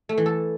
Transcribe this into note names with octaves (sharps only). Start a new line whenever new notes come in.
A3
E3
A4